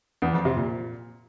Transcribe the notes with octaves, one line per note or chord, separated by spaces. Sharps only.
E2
F2
C3
A#2